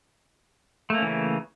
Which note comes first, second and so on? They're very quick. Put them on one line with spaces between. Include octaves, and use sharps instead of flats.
A3 A#3 C#4 E3 C#3